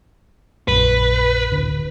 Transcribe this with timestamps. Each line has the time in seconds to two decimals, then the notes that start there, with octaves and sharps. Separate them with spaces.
0.68 A#1 F#2 B4
1.52 D1 D3